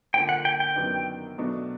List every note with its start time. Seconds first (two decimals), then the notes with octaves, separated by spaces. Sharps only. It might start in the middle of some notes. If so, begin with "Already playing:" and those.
0.14 D3 F3 A#3 G5
0.29 F#5
0.45 G5
0.60 G5
0.76 F#2 D#3 F#3 B3 D4
1.38 B2 F#3 A3 D4